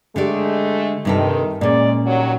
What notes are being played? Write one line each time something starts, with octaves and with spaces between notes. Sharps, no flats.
D3 G#3 A3 G4 D5
G2 C3 D#3 A4
A#2 G#3 C#4 D5
G2 D#3 F#3